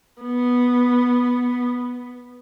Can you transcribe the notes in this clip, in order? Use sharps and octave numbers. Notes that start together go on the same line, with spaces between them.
B3